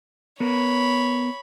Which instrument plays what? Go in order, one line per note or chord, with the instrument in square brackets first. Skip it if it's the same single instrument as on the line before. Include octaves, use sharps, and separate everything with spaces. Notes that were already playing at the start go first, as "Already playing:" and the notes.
[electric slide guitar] B3 A#4 [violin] C#5 B5